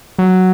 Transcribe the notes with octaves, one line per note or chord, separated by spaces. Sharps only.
F#3